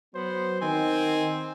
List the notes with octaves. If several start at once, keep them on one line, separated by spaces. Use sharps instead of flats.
F#3 B3 C5
D#3 C4 G#5